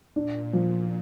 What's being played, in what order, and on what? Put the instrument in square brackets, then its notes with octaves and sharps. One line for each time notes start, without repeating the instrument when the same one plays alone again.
[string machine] A#2 [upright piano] D4
[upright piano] F3